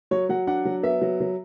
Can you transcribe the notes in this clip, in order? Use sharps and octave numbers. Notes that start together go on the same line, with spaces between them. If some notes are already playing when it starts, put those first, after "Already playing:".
F#3 C#5
F#3 F#5
D4 F#5
F#3
B3 E5
F#3
F#3